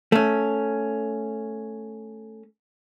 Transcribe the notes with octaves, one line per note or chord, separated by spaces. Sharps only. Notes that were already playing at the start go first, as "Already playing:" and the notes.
A3 C#4